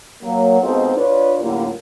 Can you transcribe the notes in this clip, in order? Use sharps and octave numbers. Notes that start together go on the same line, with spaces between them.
F#3 A#3
B2 G#3 C4 D#4 F4 A4
D4 F4 B4 C#5 D5
F#2 A2 D3 G3 A#3 F4